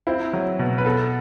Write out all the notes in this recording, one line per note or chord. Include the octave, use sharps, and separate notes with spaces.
C4 E4
F#3
B2
B4
B3 A4